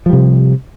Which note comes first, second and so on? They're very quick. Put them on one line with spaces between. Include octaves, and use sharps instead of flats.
F3 G3 C3